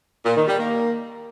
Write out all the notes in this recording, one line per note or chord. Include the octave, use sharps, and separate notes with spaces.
A#2
D#3
G3
A#3